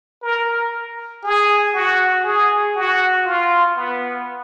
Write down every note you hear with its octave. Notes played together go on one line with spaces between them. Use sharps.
A#4
G#4
F#4
G#4
F#4
F4
B3